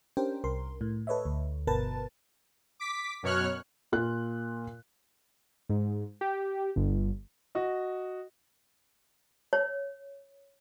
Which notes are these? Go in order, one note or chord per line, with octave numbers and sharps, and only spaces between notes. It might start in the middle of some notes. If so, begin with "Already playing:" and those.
C#4 D4 G4 A#4 C5 G5
C2 A#4 C6
A2
A4 B4 C#5 D#5 E5
D2
G1 B2 A#4 B4 A5 A6
D6 B6
F#2 B2 C#5 F6 F#6
A#2 F4 F#6
G#2
G4
G1
F#4 D#5
C#5